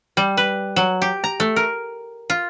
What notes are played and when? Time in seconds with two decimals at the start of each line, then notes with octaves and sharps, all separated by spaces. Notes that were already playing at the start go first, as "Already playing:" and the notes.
0.17 G3
0.37 B4
0.76 F#3
1.02 G4
1.24 A#5
1.40 A3
1.56 A#4
2.30 F4